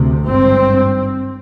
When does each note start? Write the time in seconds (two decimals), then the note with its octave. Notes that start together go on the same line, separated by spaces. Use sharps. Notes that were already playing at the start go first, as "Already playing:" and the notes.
Already playing: D2 C3
0.26 G#1 G2 C4